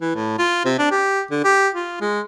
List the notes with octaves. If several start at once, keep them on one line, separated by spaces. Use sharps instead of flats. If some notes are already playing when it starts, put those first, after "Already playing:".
E3
A2
F4
C3
D4
G4
D3
G4
F4
G#3